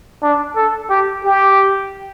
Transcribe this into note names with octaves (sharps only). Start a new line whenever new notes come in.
D4
A4
G4
G4